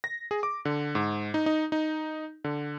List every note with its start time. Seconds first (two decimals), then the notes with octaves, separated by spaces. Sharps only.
0.04 A#6
0.31 G#4
0.43 D6
0.65 D3
0.95 G#2
1.34 D#4
1.46 D#4
1.72 D#4
2.44 D3